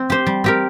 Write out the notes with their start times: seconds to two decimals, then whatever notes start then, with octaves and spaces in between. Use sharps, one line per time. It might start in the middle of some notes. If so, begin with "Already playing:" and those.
Already playing: C4
0.10 G4 C5
0.27 G3
0.44 C4 G4 A#4